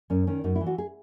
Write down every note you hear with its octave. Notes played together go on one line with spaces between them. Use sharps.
F#2 C#4
D#3 C#4
F#2 D#4
E4
E3
F#4
G#4